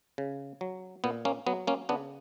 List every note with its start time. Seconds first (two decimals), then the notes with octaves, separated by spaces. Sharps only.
0.18 C#3
0.61 F#3
1.04 A#2 B3
1.25 A#3 C#4
1.47 F#3 B3
1.67 A#3 C#4
1.89 C#3 B3 D4